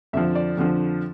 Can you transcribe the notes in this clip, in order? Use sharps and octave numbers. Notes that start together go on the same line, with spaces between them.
F2 D3 F3 E5
D5
F2 D3 F3